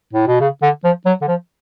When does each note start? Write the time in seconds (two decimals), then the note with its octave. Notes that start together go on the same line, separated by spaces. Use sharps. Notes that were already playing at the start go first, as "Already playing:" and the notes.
0.13 A2
0.27 B2
0.41 C#3
0.62 D3
0.84 F3
1.06 F#3
1.21 D3
1.28 F3